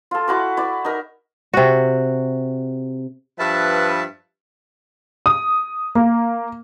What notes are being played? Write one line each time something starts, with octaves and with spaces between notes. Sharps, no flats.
F4 A4
E4 F#4 D6
E4 D5
D#4 A#4
C3 F#4
G2 F3 B4 E5 A5
D#6
A#3